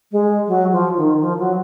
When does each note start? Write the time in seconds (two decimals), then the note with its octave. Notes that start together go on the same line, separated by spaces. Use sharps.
0.12 G#3
0.48 F#3
0.72 F3
0.97 D#3
1.21 F3
1.39 F#3